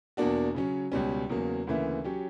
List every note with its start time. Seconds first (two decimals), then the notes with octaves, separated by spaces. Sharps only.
0.17 E2 B2 A#3 D4 F#4
0.55 C#3 F#3 C#4
0.92 C#2 B2 G3 C#4
1.29 E2 C#3 F#3 A#3
1.67 D2 C#3 E3 A#3 E4
2.04 F#3 C#4 G4